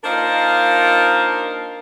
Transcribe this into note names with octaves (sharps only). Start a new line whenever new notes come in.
A#3 D4 D#4 F4 A#4 C5